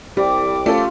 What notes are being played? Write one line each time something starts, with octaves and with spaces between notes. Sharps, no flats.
C2 G3 G4 D6
A3 C#4 F4 A4